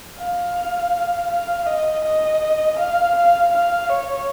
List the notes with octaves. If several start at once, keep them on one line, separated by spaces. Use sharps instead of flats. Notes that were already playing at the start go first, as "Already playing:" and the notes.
F5
F5
D#5
D#5
F5
F5
F5
C#5